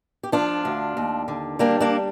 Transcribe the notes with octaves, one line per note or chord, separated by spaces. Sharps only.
G4
F3 D4 F4
D2
D#2
D3
G3 A#3 D4
A#3 D4